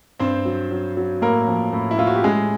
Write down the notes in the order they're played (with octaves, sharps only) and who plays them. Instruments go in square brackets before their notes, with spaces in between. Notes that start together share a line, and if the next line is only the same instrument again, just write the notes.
[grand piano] G2 C4 C5
F#3
F#3
F#3
A2 A#3 A#4
F3
A2
E4
A2 F4
F#4
G4
A2 G#3 G#4